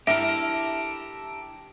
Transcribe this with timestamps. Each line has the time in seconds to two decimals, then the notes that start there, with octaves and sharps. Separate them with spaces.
0.07 D4 E4 G4 A4 A#4 E5